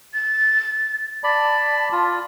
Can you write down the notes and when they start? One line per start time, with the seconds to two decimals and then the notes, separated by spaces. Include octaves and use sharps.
0.14 A6
1.24 D5 A5 B5
1.92 F4